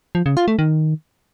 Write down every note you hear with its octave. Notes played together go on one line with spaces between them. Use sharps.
F3
C#3
F4
A3
D#3